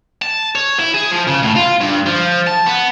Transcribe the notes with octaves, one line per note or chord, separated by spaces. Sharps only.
A5
C#5
E4
G#4
F3
C#3
A2
F4
G2
F3
A5
B3